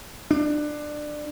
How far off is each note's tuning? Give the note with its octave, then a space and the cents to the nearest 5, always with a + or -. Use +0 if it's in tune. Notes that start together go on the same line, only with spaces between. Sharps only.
D4 +20